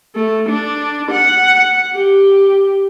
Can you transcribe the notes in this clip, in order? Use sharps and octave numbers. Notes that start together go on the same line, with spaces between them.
A3
D4
F#5
G4